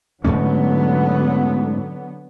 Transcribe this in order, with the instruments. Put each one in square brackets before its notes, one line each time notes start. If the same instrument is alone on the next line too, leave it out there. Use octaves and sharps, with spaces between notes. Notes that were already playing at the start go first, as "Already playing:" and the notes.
[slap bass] G#2 A3 C#4 [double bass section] D3 F#3 B3